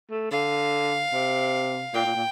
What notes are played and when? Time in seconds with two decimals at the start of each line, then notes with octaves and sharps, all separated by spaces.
0.10 A3
0.31 D3 F5
1.13 C3
1.94 A#2 G5
2.05 A#2
2.16 A#2